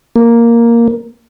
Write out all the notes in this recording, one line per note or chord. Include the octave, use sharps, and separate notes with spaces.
A#3